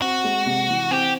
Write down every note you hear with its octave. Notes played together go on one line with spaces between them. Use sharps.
C4 F#4
G#3
C3
E3
C4 G4